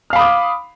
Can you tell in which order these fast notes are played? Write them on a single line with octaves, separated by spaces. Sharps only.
F6 F5 B5 D#6 D6